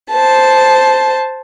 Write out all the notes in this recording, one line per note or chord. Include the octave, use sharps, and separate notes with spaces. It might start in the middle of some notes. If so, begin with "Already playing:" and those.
C5 A5